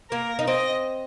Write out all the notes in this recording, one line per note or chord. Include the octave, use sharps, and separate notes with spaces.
A#3 A#4
D#4
C4 D#5